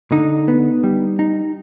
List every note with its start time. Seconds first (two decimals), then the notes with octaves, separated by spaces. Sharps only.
0.12 D3 D#4
0.48 B3
0.84 G3
1.19 D#4